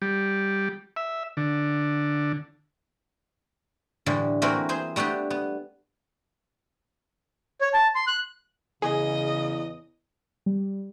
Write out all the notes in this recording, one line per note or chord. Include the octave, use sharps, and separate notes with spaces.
G3
E5
D3
A2 D3 E3 G3
E3 A3 A#3 C4 F#4 A#4
G#4 C5 G#5
G3 A3 B3 D4 G4
B3
C#5
A5
C6
F#6
E2 C#3 G#4 D#5
G3